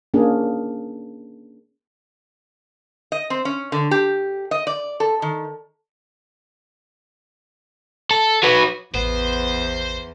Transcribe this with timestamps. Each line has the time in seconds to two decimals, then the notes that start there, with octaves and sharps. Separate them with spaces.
0.14 A#3 C#4 D4 G#4
3.12 D#5
3.30 C4
3.45 C#4
3.72 D3
3.91 G4
4.51 D#5
4.67 D5
5.00 A4
5.22 D#3
8.11 A4
8.43 F#3 B4
8.95 A1 E2 B3 C5